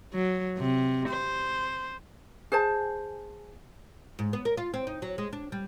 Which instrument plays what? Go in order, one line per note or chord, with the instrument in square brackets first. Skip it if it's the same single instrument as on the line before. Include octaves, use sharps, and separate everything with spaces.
[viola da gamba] F#3
C3
C5
[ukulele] G#4 C5 A5
[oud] G#2
B3
A#4
F4
C4
D#4
F#3
G#3
D4
G3